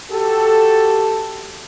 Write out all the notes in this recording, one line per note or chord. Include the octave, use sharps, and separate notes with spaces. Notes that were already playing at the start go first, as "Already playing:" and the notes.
F#4 G4 A4